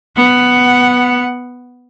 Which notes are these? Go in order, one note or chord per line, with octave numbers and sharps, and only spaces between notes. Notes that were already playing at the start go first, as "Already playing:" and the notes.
B3 F#5